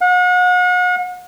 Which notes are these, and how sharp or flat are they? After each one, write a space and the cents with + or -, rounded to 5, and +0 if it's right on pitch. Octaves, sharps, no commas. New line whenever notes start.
F#5 -40